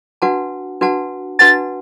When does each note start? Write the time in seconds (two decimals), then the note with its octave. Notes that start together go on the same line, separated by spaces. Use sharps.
0.22 D4 F#4 B4 F#5 A5
0.81 D4 F#4 B4 F#5 A5
1.39 D4 F#4 B4 F#5 A5 A6